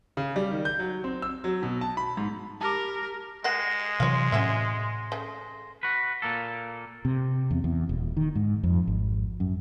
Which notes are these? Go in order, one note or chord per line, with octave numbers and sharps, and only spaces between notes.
C#3
G3
D#3
G6
F#3
C4
E6
F#3
B2
A5
B5
G#2
G4 A#4 A5 D6
G#3 A#4 F#5 G5 A#6 C7 E7
C3 E3 F#3 C#5 F5 C6
A2 C#4 F#4 E5
C#3 A3
F#4 B4
A#2 A#3 A4
C3
E2
E2
D#1
D#3
G#2
F2
G#1
F#2